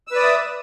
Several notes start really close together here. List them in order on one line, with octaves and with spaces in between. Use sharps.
E6 B4 D5 D#6 E5